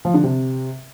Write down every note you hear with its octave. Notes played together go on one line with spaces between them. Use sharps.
F3
D3
C3